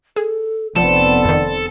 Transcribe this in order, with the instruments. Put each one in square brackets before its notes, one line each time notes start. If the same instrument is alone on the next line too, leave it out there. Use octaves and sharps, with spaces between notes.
[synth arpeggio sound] G#4 [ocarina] A4
[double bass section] F1 B3 C4 [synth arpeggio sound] F3 [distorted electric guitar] A4 [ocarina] D5
[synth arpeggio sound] F2 D#3